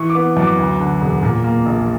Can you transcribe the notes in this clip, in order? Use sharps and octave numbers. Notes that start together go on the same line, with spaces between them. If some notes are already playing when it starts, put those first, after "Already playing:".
Already playing: E3 C#6
D6
B3
F#2
D6
D2
D3
E1
A#2
A#3
A#1